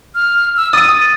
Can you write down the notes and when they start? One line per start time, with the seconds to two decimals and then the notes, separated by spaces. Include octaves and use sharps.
0.15 F6
0.56 E6
0.73 D#6 A6 D#7